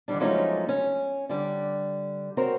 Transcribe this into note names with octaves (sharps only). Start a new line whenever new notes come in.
D3 D#3 F#3 G3 D4
F3 F#3 G#3 A3 C#4 D#4
C#4
D3 G3
C4 F#4 A#4 C5 C#5